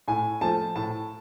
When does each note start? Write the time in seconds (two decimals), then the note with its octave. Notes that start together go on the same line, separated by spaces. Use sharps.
0.08 A2 G#5
0.41 F3 A3 A5
0.75 A2 A5